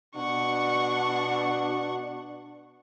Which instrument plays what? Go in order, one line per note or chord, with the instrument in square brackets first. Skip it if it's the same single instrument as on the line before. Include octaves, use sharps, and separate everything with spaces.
[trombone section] B2 D4 [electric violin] F#5 C#6